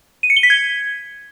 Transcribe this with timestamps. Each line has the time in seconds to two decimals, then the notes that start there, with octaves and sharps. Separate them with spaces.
0.23 D#7
0.30 C#7
0.37 G7
0.43 B6
0.50 G#6